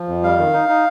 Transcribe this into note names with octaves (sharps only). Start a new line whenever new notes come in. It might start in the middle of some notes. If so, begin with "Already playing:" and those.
Already playing: F3
F2
G3 F5
D#3
D#4
D#4